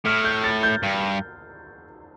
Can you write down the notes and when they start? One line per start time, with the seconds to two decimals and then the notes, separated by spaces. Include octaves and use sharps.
0.05 A2 F6
0.24 G6
0.44 A6
0.63 G6
0.83 G2